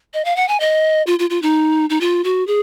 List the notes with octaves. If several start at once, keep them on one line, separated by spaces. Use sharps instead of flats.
D#5
F5
F#5
G#5
D#5
F4
F4
F4
D#4
D#4
F4
F#4
G#4